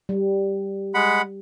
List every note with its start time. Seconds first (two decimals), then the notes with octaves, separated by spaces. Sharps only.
0.09 G3
0.94 G#3 F#5 B5